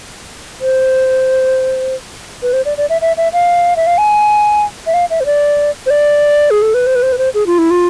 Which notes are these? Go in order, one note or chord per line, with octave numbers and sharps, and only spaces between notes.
C5
B4
C5
D5
D5
E5
E5
E5
F5
E5
F5
G#5
E5
F5
E5
C5
D5
C5
D5
G#4
A4
B4
C5
B4
C5
B4
C5
G#4
F4
E4
F4